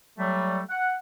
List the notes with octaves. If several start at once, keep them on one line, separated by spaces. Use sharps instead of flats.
F#3 G3 A3
F#5